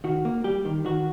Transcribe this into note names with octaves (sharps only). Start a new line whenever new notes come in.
D#3 F#4
A#3
G3 G4
D#3
D#3 F#4